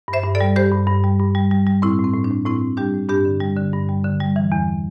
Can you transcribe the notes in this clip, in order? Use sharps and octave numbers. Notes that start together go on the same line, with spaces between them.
G2
C5 E5
G2
A4 D5
G3
G2 G4 C5
G2
G2
G3
G2
G3
G3
G3
A2 C4 E4
A2
C4
A2
D4
A2
A2 C4 E4
A2
G3 D4 G4
A2
G2 D4 G4
D3
G3
D3
G2
G3
D3
G3
E3
E2